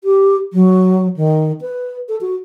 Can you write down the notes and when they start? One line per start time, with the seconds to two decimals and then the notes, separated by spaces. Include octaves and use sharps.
0.04 G4
0.53 F#3
1.16 D#3
1.61 B4
2.09 A4
2.21 F#4